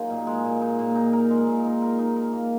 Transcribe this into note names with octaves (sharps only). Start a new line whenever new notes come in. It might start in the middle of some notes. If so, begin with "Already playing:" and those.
Already playing: F#3 A#3 D#4 F4 G#4
A#2
G#3
A#2
D#4
A#2
D#4
A#4
G#3
A#2
D#4
A#4
D#4
A#4
A#3